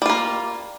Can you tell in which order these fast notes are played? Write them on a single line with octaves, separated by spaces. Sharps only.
G3 F4 A#3